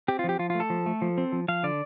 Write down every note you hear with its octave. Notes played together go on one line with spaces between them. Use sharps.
C4 G4
F4
F3 G4
F3 F4
A3 F4
A4
F3
A3
F3
C4
F3
F3 F5
D3 D5